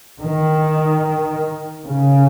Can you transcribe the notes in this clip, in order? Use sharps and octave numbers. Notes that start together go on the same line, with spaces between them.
D#3
C#3